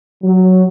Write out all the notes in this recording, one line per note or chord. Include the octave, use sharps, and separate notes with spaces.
F#3